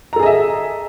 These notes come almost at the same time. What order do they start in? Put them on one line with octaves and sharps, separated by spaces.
A#5 A4 G#4 D#5 E5